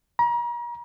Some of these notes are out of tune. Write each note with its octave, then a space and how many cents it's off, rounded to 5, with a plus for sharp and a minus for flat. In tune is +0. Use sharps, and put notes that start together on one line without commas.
A#5 +40